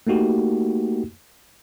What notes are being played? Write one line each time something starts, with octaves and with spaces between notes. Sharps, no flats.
A3 A#3 D#4 F#4 G4